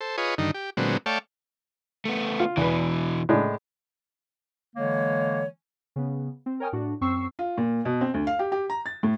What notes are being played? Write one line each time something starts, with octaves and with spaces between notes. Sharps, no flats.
A4 C5
F4 G#4 B4 C#5 D#5
G2 D3 D#3 D#4
G4
A#2 D3 F#3 G#3 B3 C4
A3 C#5 D5 F5 G5 A5
A3 B3
F4
E2 B2 E3 B4
A2 G#3 D4
D3 E3 G#3 A#3 C#5
C#3 B3
C4
A#4 C#5 G5 G#5 D#6 F6
A2 D4 F#4
F#2 C4 C#6 E6 C7
F4
A#2
B2
C4
D2
F5
G4
G4
A#5
A6
A2